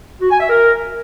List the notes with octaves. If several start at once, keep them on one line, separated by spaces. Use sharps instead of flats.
F#4
G#5
E5
A#4